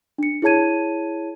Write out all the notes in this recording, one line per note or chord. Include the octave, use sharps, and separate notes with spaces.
D4 C#7
E4 G#4 C#5 A5 G#6 D#7